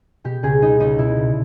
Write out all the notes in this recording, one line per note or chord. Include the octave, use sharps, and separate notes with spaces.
B2 G4
C#2 G#4
G3 D#4
C#2 D#4
B2 E4
C2